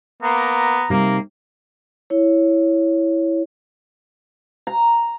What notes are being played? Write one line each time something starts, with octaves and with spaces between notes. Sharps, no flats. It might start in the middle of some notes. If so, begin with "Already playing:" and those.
A#3 B3 A#5
C3 G3 A#3 D#4
E4 C#5
A#5